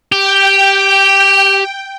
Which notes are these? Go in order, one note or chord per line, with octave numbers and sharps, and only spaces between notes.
G4 G5